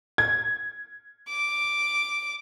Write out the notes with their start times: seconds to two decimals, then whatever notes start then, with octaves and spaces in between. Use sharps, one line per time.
0.18 G#6
1.29 D6